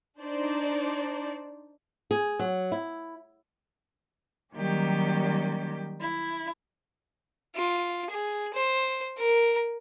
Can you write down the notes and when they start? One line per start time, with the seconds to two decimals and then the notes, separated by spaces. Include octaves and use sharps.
0.19 D4 D#4 C5 D5
2.11 G#4
2.39 F#3
2.72 E4
4.54 D#3 F#3 G3 A#3 C#4 G4
5.99 E4
7.55 F4
8.10 G#4
8.54 C5
9.18 A#4